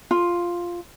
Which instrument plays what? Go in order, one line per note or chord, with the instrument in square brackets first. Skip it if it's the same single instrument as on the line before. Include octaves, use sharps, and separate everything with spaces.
[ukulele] F4